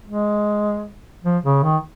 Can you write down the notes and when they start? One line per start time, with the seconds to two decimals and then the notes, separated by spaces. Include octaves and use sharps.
0.06 G#3
1.24 F3
1.44 C#3
1.63 D#3